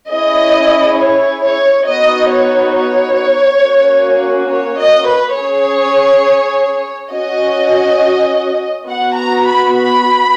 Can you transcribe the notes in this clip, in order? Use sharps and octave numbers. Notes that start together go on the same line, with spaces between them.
C#4 E4 G#4 D#5
C#5
C#5
B3 D#4 F#4 D#5
C#5
C#5
A#3 C#4 F#4
C#5
D#5
B4
C#4 G#4 C#5
C#4 F#4 D#5
B3 F#4 F#5
A#5
B5
B5